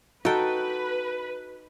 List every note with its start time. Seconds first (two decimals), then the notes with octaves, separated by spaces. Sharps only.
0.25 D#4 F#4 A4 B4 G5